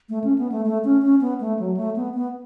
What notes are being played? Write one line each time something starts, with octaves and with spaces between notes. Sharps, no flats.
A3
C#4
B3
A3
A3
C#4
C#4
B3
A3
F#3
A3
B3
B3